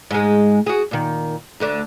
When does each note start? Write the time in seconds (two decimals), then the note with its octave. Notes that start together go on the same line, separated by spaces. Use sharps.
0.11 G#2 G#3
0.66 F#4 G#4
0.91 A#2 D#3
1.60 D2 D3 D4